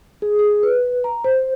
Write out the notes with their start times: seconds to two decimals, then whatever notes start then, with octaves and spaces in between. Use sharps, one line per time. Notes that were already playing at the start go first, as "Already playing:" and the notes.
0.22 G#4
0.39 G#4
0.63 B4
1.04 A#5
1.24 C5